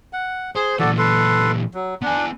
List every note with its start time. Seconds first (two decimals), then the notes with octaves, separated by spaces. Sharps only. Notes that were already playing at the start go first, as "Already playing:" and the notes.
0.13 F#5
0.56 G#4 C5
0.79 A#2 E3 F#4 A4 D5
0.98 A4 B4 C6
1.74 F#3
2.02 B3 D4 G#5